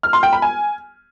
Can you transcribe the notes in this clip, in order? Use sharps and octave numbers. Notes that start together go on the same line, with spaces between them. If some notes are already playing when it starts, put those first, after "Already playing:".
F6
C6
G5
B5
G#5